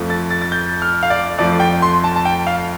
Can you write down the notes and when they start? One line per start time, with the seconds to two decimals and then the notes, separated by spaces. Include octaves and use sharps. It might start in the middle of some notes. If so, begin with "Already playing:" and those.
Already playing: F2 F3 A3
0.10 A6
0.31 A6
0.42 A6
0.52 G6
0.82 F6
1.03 F5
1.10 D5
1.38 F2 F3 A3 D5
1.60 G5
1.82 C6
2.04 A5
2.16 A5
2.25 G5
2.47 F5